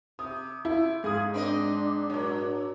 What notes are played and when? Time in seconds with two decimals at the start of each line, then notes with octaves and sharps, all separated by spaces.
0.19 C3 D#6
0.65 E4
1.04 G#2 G#4 F5 D#6
1.34 C4 D4 B4 D#5
2.10 A#2 F#3